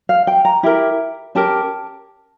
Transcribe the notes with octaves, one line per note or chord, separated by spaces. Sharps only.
F5
G5
A#5
E4 G4 A#4 A#5
C#4 G4 A#4 A5